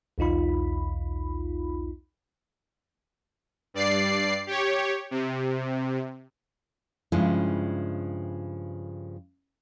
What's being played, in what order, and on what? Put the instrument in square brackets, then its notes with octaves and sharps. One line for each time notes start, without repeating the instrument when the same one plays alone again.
[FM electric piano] B1 E2 D#4 F4 B5
[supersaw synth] G2 D5 C7
G4 C#5
C3
[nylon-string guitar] G2 C#3 F3 G#3 E4